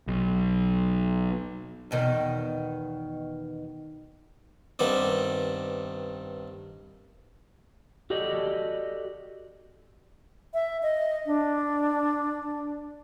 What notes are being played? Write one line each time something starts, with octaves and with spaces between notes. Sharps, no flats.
B1
E2 B2 D#3
G2 D#3 B3 C4 D5
F#4 G4 A4 D5 D#5
E5
D#5
D4